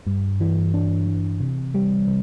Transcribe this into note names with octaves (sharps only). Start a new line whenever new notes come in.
G2
E3
D4
E3
C3
G3
C3